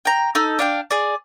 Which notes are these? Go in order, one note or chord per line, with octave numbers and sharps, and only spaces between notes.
G5 A#5
D#4 A4
D4 F5 G5
G#4 D5